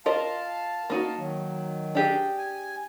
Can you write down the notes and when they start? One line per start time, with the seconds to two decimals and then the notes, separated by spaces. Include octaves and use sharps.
0.06 F4 A#4 D#5 F5 A5
0.90 A#3 D#4 F#4
1.17 D#3 F#3
1.95 D4 G4 G#4
2.38 G#5